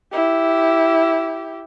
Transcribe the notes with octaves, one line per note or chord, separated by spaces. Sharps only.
E4 G4